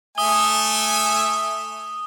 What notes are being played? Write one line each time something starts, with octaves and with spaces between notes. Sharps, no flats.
A3 E5 G#5 D#6 G7